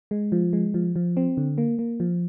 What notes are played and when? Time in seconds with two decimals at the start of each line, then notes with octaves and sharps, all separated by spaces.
0.11 G#3
0.32 F3
0.53 G#3
0.74 F3
0.96 F3
1.17 C4
1.37 D3
1.58 A#3
1.79 A#3
2.00 F3